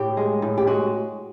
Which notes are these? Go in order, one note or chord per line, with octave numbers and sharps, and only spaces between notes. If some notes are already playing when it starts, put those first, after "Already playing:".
Already playing: A2 G4
G#3
A2
G4
G#3 F#4